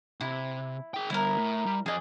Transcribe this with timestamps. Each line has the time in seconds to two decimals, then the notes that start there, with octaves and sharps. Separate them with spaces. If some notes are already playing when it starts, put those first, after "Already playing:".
0.21 C3 E4
0.94 G#4 G5
1.10 D3 G3 E4 A#4
1.37 A2
1.66 G3
1.86 F2 G#4 D5 D#5